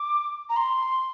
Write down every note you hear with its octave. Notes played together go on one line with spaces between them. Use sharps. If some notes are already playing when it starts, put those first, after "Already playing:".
Already playing: D6
A#5
C6